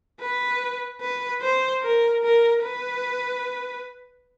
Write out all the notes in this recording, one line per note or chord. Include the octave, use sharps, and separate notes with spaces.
B4
B4
C5
A#4
A#4
B4